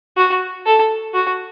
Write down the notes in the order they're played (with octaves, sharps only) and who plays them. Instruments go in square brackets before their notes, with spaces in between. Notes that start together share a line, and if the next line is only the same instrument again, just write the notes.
[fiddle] F#4
A4
F#4